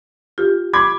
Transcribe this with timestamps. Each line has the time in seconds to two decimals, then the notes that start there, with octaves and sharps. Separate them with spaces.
0.38 F4 G4
0.73 B5 D6 G#6